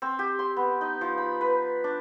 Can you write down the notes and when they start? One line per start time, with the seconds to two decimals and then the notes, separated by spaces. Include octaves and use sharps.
0.02 C4
0.19 G4
0.39 C6
0.56 B3
0.81 D#4
1.01 F3
1.18 B5
1.41 B4
1.84 D4